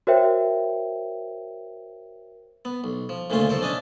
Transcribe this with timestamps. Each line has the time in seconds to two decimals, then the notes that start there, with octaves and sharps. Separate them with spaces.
0.07 F#4 A#4 C5 C#5 E5 G5
2.65 B3
2.84 B1
3.09 F3
3.30 D2 A#2 C#3 A3 F4 C6
3.49 B1 F3 A4 C5 G5
3.62 C#4 D4 D#5 E5 A5